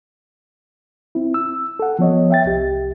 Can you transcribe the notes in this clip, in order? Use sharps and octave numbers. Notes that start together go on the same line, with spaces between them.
C4 E4
E6
A4 F#5
F3 B3 C#5 D#5
E5 G5 A6
C2 G4